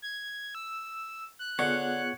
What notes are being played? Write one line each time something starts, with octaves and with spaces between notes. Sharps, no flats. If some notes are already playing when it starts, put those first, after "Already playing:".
G#6
E6
F#6
D3 B3 F4 G#4 C#5 F#5